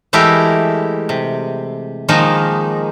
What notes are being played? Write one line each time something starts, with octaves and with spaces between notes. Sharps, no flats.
E3 G#3 A3 E4 G4 A#4
C3
D#3 F3 G#3 A#3 D#4